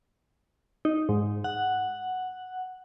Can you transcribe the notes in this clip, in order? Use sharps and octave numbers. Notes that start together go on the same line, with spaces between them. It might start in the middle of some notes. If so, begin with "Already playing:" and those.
D#4
G#2
F#5